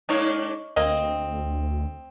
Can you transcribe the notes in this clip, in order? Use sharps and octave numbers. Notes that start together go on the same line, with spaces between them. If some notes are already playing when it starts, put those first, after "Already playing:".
G#2 A#3 D4 D#4 C#5
D2 A#3 C4 D#5